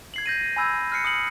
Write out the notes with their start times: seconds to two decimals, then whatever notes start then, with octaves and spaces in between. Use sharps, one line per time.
0.14 G#6 C7 F#7
0.26 G6 A#6 D#7
0.56 G#5 B5 E6 G6 G#6
0.92 F6 F#6 C7 C#7
1.05 D#6 C#7 F#7